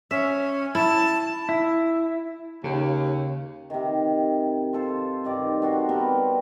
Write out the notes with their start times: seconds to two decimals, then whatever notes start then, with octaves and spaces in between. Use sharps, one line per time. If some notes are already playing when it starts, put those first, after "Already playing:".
0.11 C#4 E5
0.75 E4 A5
1.49 E4
2.64 D#2 C#3
3.70 C3 D#3
4.73 F4 A4 C5
5.24 G2 D#3 D5
5.62 C4 D4 F#4 C5
5.89 G3 B3 C4 A#4